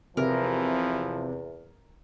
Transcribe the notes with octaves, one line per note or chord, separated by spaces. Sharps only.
E2 C3 E3 F3 A#4